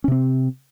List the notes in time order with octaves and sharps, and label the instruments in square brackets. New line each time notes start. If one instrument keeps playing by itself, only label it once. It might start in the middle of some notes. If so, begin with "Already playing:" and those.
[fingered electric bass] C#4
C3
C4